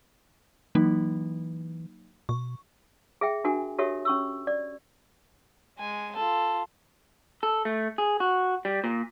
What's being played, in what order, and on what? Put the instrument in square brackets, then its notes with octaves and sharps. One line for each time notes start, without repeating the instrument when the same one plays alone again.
[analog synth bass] E3 [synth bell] F#3 A#3 D#4
[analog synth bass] B2 [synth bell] C#6
[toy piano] G#4 E5 G5
D4 F#4 A#4 G#5
F#4 G4 A4 A#4 C#5 E5
C#4 C#6 E6
D5
[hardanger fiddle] G#3 G#5
F4 A4
[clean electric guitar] A4
A3
G#4
F#4
G3
A#2